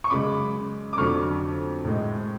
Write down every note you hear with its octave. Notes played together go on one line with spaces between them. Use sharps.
C#6
F#2 C#3 G#3 B5 D6
D6
F2 D3 F#3 A3 C#6 F6
A2 G#3